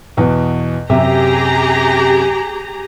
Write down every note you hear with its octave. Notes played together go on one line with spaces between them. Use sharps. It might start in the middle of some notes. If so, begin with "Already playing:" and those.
E2 B2
F#2 C3 G4 G#4 E5 A#5